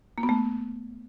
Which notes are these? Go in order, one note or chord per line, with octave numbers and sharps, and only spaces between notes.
A#3
B3
A3